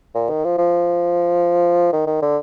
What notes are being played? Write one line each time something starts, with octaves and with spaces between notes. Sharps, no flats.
A#2
D#3
F3
F3
D#3
D#3
D3